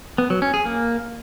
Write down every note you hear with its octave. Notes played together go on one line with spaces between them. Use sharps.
B3
F#3
C#4
G#4
A#3